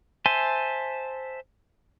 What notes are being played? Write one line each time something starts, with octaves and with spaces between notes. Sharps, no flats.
C5 E5 G#5 A5 C6